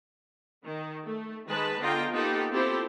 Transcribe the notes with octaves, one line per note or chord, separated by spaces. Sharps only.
D#3
A3
D#3 G#3 B4 A5
D3 B3 F4 D#5 G5 A#5
A#3 B3 D#4 F4 G4 A4
C4 E4 F4 G4 A4 C5